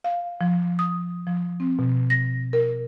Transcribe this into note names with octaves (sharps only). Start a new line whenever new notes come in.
F5
F3
D#6
F3
C4
B2
A#6
A#4